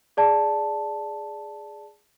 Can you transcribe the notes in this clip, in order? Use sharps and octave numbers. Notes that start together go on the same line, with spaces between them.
G#4 D5 A5